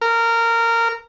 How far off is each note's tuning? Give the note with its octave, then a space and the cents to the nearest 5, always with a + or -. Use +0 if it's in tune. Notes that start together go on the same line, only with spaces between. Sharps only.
A#4 -20